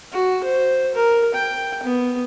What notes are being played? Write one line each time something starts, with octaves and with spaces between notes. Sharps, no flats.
F#4
C5
A#4
G5
B3